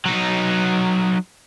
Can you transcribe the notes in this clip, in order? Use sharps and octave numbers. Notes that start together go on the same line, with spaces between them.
F#3 D#4